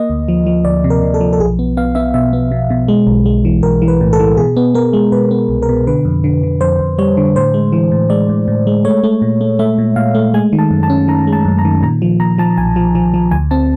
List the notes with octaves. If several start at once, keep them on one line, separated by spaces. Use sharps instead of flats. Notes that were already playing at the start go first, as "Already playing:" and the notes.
Already playing: A#3 D#5
D2
F3
F3
D2 D5
C3
A#4
C3
A4
F3
A4
B1 G#4
B3
B3 F5
B3 E5
B2 E5
B3
B2
B2
G#3
B1
G#3
E3
B1 A#4
E3
B4
A2
A4
E3
B2 G#4
B3
B3 A#4
G#3
B2 B4
B3
C2
A#4
B2
D3 B4
F2
D3
D3
F2 C5
F2
G3 C#5
D3
A2 C5
G#3
E3
A2
G#3 D5
A2
A2
G#3
A3 C#5
A3
A#2
A3
A3 E5
A#2
A#2 F5
A3
G#3 G#5
D#3
A5
F#2
A5
C#4
D#3 A#5
G#3
A5
F#2
A#5
D#3
A#2 A#5
F3
A#2 A#5
F3 A5
B1 G#5
F3
F3
F3
D2 G#5
C4 A5